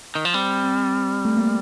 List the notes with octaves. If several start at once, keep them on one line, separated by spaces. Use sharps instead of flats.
D#3
F3
G3 C4
C4
A3
A#3